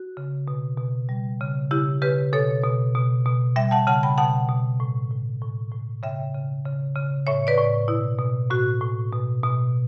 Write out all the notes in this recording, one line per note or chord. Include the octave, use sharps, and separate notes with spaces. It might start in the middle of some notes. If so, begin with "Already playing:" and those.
Already playing: F#4
C#3
B2
B2
G3
C#3
C#3 E4 G4
C#3 G4 B4
B2 A4 C#5
B2
B2
B2
G3 E5 G5
F#5 A5
C#3 F#5 A5
G5 B5
B2 F#5 A5
B2
A2
A2
A2
A2
C#3 E5 G5
C#3
C#3
C#3
A2 C#5 E5
B4 D5
A2
B2 E4
B2
A2 F#4
A2
B2
B2